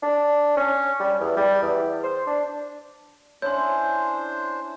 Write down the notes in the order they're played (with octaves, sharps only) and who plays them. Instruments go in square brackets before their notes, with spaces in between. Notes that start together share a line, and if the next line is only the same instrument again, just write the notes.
[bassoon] D4
C#4
G3
E2
G3
E2
C5
D4
[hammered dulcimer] C#4 E4 [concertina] D4 C5 [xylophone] C#5 [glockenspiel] C6 G6